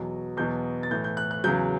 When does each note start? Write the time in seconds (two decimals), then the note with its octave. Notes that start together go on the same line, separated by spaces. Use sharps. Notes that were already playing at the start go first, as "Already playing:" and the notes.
Already playing: E2 B2 F#3
0.37 E2 B2 F#3 G6
0.83 A6
0.91 A2 E3 G6
1.04 G6
1.17 F#6
1.31 F#6
1.44 E2 C#3 F#3 G6